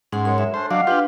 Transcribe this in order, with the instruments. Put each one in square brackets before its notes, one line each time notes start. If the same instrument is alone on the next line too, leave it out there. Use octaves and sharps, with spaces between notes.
[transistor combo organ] G#2 [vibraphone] C#4 F#5 C6
[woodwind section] F#2 G#3 [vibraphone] C#5 C6
[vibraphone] E5
[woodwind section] A3 C#4 D4 [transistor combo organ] C5
[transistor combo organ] F#3 D4 [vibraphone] D#5 F#5 [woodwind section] F5
[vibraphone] D4 B4 [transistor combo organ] F4 G4